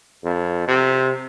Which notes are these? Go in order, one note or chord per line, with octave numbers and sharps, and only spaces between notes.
F2
C3